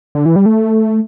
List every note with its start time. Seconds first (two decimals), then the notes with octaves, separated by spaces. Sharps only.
0.15 D3
0.26 E3
0.36 G3
0.46 A3